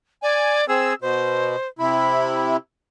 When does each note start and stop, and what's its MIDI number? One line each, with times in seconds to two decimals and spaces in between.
0.23 0.67 74
0.23 0.61 80
0.69 0.93 60
0.69 0.95 68
0.69 0.93 88
1.02 1.56 47
1.02 1.68 72
1.79 2.57 48
1.79 2.57 64
1.79 2.56 83